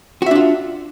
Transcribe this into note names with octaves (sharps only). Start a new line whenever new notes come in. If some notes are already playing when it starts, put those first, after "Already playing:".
D4 F4 F#4 E5